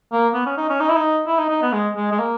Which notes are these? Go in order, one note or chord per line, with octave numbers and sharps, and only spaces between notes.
A#3
B3
C#4
D#4
C#4
D#4
E4
D#4
E4
D#4
D#4
B3
G#3
G#3
G#3
A#3